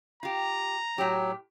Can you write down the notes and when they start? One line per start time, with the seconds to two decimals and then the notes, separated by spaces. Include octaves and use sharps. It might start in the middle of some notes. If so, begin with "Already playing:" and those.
0.23 F4 G4 A#5
0.98 A2 F#3 G4